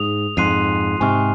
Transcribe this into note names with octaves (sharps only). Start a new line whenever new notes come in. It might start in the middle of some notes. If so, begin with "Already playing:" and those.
Already playing: G#2 D#6 F7
F2 G#2 C6 F#6 C7 D#7
G#2 C3 G#5 C#6 F6